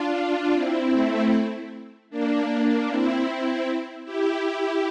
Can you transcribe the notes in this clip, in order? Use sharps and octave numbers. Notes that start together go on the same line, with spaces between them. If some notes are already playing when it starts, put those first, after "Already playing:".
Already playing: D4 F4
C4 E4
A3 C4
A#3 D4
C4 E4
C4 E4
E4 G4